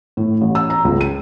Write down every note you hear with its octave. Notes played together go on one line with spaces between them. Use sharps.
A2
A1
E6
A#5
C#2
D#7